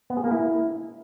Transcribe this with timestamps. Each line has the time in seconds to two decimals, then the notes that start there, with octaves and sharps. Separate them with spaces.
0.10 B3
0.17 G#4
0.24 A#3
0.31 E4